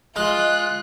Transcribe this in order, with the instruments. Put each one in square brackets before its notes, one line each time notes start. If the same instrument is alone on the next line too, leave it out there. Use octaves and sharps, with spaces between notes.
[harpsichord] G#3 [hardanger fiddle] F4 [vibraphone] D#5 [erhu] F#6